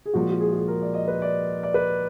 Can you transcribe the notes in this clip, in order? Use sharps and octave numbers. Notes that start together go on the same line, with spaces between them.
G#4
A#2 F3 G#3 F#4
F#4
G#4
F#4
G#4
A#4
D5
D#5
B4
D5
D5
B4